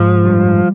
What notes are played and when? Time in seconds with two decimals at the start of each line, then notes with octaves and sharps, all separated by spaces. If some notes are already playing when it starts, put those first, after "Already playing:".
Already playing: G#2 F3
0.25 G3